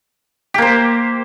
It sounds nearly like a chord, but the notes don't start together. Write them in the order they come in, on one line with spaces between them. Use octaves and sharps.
G4 A#3 C5